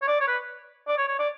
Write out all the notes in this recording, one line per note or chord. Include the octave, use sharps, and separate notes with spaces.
C#5
D5
C#5
B4
D5
C#5
C#5
D5